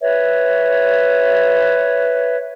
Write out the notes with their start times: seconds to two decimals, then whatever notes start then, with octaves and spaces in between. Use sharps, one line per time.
0.01 B4 C#5 E5